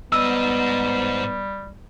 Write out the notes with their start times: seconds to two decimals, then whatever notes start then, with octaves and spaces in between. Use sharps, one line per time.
0.12 G#2 G3 B3 D#5 E6